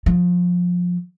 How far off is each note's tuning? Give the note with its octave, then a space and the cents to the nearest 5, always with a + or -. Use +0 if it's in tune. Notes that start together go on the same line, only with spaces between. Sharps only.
F3 +25